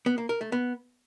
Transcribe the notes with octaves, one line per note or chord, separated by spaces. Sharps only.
B3
A#3
A#4
A3
B3